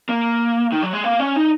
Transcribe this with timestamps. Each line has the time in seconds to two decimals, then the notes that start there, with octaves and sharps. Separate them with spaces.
0.09 A#3
0.72 D#3
0.83 F#3
0.93 G#3
1.04 A#3
1.19 C#4
1.36 D#4